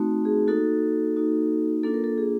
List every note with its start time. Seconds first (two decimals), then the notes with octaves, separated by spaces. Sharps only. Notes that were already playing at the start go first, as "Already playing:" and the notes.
Already playing: A3 C4 D#4 F#4
0.25 G#4
0.48 A#3 D#4 F#4 A4
1.16 A#3 D#4 F#4
1.83 A#3 D4 F4 A4
1.94 A#4
2.04 A4
2.18 G#4